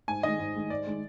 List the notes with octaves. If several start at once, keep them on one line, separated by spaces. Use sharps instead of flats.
G#2 G#5
D#3 G#3 D#5
G#2
D#3 G#3
G#2 D5
D#3 G#3